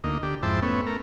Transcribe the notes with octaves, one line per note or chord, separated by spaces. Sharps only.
D2 A#3 D#4
D3 G4
F2 G#2 E4 C5 G5 A5
A3 B3 C#4
A3 A#4